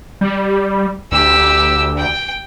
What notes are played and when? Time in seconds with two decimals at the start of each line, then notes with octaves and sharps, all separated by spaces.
0.21 G3
1.12 D2 G4 E6
1.97 G5